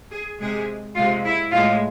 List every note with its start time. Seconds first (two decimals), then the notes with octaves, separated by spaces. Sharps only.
0.11 G#4
0.40 C3 G#3 G#4
0.95 C3 G#3 F4
1.24 E4
1.51 A2 G#3 F4